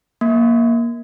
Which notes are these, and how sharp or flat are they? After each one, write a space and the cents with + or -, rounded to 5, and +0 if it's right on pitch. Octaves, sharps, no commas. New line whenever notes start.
A#3 +10